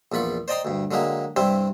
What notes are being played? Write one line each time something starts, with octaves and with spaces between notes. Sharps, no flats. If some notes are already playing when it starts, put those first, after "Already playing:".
A#1 E2 F4 B5 C#6
C5 D5 D#5 G5 A#5 C6
D2 G2
D3 F#3 G#3 A#3 G4
G2 C3 G3 C4 E4 C5